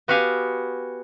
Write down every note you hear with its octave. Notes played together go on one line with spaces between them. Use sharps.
B3 F#4 G4 F5 G#5